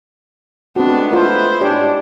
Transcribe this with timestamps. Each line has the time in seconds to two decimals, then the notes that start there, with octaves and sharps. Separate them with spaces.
0.76 G#3 A3 B3 C4 D4 F#4
1.11 E4 F4 A#4 C5
1.61 G#2 D4 G4 C#5